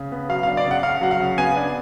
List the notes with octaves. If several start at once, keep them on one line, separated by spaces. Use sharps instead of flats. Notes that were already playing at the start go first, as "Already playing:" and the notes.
Already playing: C#3
B3
F#3 F5
F5
D4
D5
C#3
F#5
C#3 F5
F#3 F#5
F5
C#3
B3 G#5
D4